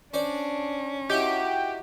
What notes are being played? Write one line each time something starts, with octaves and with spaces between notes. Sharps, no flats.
C#4 D4 C5 D5
D#4 E4 F#4 G4